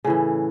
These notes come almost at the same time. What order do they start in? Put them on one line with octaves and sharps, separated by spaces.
C#3 A2 E3